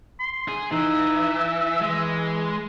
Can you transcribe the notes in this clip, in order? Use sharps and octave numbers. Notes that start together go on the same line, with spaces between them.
C6
G#4
E3 D#4 E5
E3 G#3